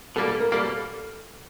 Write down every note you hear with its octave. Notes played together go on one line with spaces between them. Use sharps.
B2 G3 A#3 A4
A4
A#4
B2 G3 A#3 A4